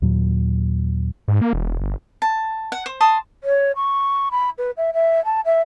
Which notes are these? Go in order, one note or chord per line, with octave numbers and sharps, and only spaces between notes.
D#2 A#2 F#3
G#2
A#3
E1
G1
A5
F#5
C5
A5 C6 D#6
C#5
C#6
B5
B4
E5
E5
A5
E5